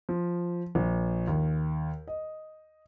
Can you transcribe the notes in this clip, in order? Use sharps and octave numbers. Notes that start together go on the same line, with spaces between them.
F3
A#1
D#2
D#5